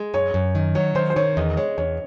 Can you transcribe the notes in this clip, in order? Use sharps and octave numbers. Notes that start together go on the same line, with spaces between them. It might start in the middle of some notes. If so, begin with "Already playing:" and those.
Already playing: G#3
F#2 C#5
F#2
D#3
F#3 C#5
D#3 C5
C5
D#3 C#5
E2 D#5
G#3 C#5
E2 C#5